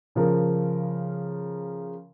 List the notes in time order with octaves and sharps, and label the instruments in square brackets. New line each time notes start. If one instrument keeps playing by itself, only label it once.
[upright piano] C#3 F3 A#4